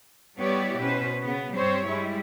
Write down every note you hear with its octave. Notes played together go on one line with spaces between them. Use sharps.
G3 B3 E4 G4 C#5 D5
B2 C#4 B4 C5
C#3 B3
G2 G3 C4 C5 C#5
G3 G#3 E4